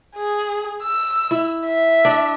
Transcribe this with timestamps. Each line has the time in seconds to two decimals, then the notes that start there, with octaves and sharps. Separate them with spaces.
0.16 G#4
0.83 E6
1.31 E4
1.66 E5
2.05 D4